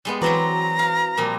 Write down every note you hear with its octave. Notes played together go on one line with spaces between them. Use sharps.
G3 G#3 B3
E3 F#3 C4 F#4 B4 D5 A#5
F5
A#2 F3 G3